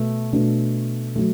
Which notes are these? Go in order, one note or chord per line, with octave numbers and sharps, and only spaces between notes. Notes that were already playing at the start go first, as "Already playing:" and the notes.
Already playing: B2 A3
B2 A3 D4
F#3 A3